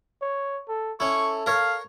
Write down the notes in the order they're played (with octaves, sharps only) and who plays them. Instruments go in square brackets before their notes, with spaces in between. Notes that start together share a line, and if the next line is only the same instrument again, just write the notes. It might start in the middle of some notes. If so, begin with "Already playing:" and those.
[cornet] C#5
A4
[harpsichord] C#4 E4 [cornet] A4 [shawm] C#6
[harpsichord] A#4 C#5 [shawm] F5